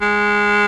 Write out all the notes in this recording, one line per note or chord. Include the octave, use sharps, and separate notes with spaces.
G#3